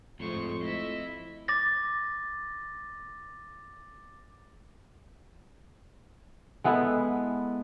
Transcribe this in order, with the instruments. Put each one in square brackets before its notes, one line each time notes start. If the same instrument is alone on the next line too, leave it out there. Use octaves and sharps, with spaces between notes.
[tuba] F2 [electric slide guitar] A2 G#3 [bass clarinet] A3 [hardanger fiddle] C5 C#6
[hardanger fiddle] E4 E5 [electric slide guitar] D#5
[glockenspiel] D6 A6 A#6
[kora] G#3 B3 E4 A4